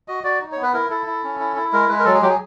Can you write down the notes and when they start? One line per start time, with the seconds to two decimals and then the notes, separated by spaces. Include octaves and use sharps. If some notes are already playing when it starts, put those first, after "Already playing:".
0.08 F#4 D#5
0.24 F#4 D5
0.41 D#4
0.52 B3 C#5
0.63 B4
0.74 E4 A#4
0.90 E4 A4
1.06 E4
1.24 C#4
1.40 E4
1.56 E4
1.72 G#3 A#4
1.89 G#3 B4
1.99 A#4
2.05 F#3 A4
2.14 G#4
2.22 F#3 G4
2.30 G#4